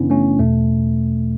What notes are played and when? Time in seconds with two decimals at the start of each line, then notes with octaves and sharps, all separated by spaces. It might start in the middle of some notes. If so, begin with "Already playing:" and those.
Already playing: F#2 C#3 E3 B3 C#4 D4 E4
0.10 A3 C#4
0.39 E2 B2 A3